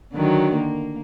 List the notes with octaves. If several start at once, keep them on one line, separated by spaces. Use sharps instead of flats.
D3 D#3 F#3
A#3